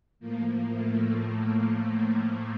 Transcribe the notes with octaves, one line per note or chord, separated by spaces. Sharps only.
A2 F3 A#3
A3